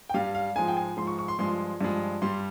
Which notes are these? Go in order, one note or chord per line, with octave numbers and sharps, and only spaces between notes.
G5
G2 G3 F5
F5
G#2 F3 G#3 G#5
G5
G#5
G#2 F3 G#3 C6
C#6
C#6
C6
G2 F3 G#3 C6
G2 F3 G#3
G2 G3 C6